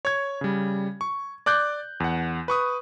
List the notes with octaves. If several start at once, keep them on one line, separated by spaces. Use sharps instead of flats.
C#5 G#6
C#3 G3
C#6
D5 D6 F#6 G6
E2 F#5
B4 C#6 D#6